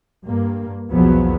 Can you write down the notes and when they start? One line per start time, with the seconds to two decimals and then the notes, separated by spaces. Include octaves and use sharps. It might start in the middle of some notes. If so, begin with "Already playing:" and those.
0.24 G2 A#3
0.90 B1 E2 F3 F#3 B3